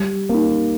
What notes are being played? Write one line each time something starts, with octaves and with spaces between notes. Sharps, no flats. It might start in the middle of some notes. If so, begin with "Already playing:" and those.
Already playing: G3
A#3 D#4